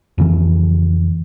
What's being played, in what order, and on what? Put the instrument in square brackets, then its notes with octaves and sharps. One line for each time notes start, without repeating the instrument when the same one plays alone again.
[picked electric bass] F2 C#3 E3